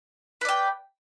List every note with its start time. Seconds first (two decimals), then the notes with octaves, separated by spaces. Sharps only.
0.41 B4
0.45 D5
0.49 G5